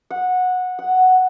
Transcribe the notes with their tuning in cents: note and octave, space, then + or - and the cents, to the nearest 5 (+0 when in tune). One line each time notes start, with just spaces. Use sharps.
F#5 -15
F#5 +5